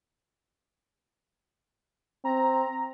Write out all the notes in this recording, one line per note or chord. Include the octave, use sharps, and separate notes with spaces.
C4 A#5